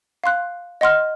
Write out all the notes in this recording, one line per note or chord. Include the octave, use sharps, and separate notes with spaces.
F5 C6 F#6
D#5 F#5 C6 F6